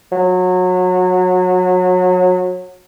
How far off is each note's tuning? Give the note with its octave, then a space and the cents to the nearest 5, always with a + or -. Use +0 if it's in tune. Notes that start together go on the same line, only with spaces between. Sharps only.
F#3 -25